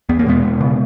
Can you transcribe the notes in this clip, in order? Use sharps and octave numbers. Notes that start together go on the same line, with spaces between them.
E2 B3
A#3
B2 G#3 B3
B2
C#3